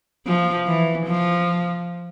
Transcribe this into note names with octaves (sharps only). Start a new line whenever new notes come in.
F3
E3
F3